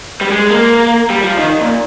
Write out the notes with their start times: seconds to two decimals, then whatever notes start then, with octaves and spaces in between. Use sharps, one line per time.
0.21 G3
0.31 G#3
0.51 A#3
1.10 G3
1.24 F3
1.38 D#3
1.61 A#2